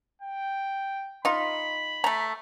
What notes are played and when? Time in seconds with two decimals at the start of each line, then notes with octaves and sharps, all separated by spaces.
0.22 G5
1.25 D#4 F4 B5
2.04 A3 A#5